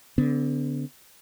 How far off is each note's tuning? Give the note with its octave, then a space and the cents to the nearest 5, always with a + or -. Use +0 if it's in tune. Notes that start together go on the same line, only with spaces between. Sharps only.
D3 -20 B3 +30